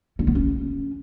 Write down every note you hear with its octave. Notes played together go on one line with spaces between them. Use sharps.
C#4
B3
C#4